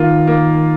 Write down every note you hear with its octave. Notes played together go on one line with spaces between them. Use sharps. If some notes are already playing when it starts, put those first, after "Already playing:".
Already playing: D#3 A#3 F4
A#3